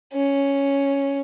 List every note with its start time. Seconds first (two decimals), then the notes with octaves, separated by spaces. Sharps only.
0.13 C#4